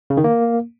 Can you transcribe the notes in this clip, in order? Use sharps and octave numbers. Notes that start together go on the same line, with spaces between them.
C#3
D#3
A#3